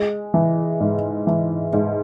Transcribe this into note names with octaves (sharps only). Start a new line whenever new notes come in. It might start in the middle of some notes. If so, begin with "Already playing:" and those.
Already playing: G#3
E3
G#2
E3
G#2